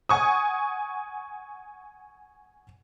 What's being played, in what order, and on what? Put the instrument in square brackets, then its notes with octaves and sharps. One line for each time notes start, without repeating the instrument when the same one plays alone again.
[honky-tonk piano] F#5 G#5 C#6 D#6